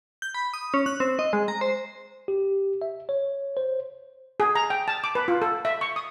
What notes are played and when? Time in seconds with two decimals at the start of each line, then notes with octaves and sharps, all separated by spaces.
0.22 G6
0.34 B5
0.54 D#6
0.74 C#4
0.86 F#6
1.00 C4
1.19 D#5
1.33 G#3
1.48 A#5
1.61 C5
2.28 G4
2.82 E5
3.09 C#5
3.57 C5
4.40 G#4
4.55 A#5
4.70 G5
4.88 A5
5.04 D6
5.15 B4
5.28 F4
5.42 A4
5.65 E5
5.81 C#6
5.96 D#6